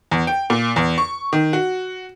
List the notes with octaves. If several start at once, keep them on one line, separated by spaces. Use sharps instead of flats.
E2
G5
A#2
E2
C#6
D#3
F#4